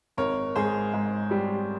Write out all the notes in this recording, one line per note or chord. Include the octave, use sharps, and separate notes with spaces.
G#1 A#4 C#5
G#2 G#4 C5
G#2
G3